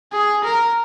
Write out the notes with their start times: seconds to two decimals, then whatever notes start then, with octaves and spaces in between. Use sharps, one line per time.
0.13 G#4
0.44 A#4